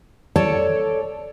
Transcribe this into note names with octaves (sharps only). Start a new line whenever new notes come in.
A4 C#5 D5 A5